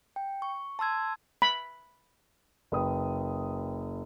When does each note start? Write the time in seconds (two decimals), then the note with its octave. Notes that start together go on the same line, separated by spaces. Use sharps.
0.16 G5
0.42 C#6
0.79 A5 C6 E6 G#6
1.42 B5
2.72 F#1 B4 G5 B5 D#6